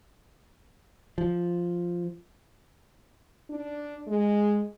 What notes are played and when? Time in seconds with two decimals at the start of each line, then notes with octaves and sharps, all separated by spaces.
1.18 F3
3.50 D4
4.08 G#3